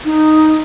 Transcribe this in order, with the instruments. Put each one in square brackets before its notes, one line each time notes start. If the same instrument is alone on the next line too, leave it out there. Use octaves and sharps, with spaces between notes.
[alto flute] D#4